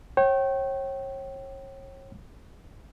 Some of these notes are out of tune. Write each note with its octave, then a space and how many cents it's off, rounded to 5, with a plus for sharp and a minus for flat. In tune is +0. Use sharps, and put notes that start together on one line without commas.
C#5 -35 G5 -30